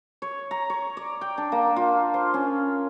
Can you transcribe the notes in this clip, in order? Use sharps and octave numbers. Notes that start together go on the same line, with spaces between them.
C#5
A#5
C#5
D5
G5
D4
A#3
F4
C5
C#4